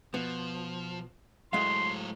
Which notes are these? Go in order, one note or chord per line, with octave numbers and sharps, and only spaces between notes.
B2 F3 B3
A2 F#3 G#3 F4 F5 C6